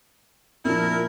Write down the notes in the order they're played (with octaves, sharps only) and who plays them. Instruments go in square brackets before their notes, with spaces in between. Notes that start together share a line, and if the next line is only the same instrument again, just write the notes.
[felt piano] A#2 F3 D4 [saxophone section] E4 A#4